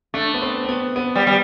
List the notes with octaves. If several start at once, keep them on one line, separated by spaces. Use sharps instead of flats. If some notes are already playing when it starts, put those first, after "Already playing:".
A3 D4
B3
C4
C4
B3
B3
G3 B3
G3